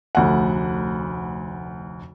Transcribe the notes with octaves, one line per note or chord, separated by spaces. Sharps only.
F1 D2 F#5